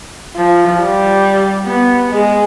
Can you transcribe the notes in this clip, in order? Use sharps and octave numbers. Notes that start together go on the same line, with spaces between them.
F3
G3
B3
G#3